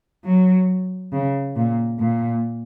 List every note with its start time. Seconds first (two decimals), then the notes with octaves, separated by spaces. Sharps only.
0.24 F#3
1.12 C#3
1.56 A#2
1.99 A#2